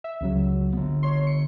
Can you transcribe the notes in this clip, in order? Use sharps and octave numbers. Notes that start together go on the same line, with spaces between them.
E5
C#2 C#3 F#3
D3 B3
C#5 C6
C#7